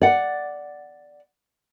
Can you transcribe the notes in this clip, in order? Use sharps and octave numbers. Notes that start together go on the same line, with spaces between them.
D5 F#5